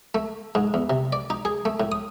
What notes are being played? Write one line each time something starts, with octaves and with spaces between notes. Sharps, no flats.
A3
G#2
E2
C3
D5
D#4
G#4
A3
A2
D#6